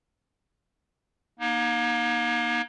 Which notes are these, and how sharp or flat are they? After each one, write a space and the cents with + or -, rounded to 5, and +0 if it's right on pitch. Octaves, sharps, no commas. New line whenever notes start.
A#3 +35 D#4 +0